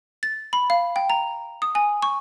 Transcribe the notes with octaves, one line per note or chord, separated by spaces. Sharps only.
A6
B5
F5
G5
A#5
D#6
G#5
C#6